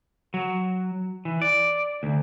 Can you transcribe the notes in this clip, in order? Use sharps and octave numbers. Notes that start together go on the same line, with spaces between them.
F#3
E3
D5
D2